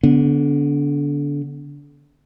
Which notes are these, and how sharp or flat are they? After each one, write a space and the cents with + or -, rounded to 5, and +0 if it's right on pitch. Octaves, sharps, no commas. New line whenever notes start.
D3 -25 B3 +0